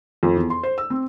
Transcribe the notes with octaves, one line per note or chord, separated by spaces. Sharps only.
F2
E2
C6
C5
E6
C4